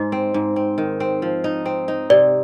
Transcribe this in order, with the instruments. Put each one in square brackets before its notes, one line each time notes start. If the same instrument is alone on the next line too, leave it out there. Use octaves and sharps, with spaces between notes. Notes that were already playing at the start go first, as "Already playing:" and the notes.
Already playing: [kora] G#2 G#3 [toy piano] D#5
[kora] C4
G#2
C4
D#3
C4
F3
D#4
C4
D#4
[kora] C3 [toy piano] D5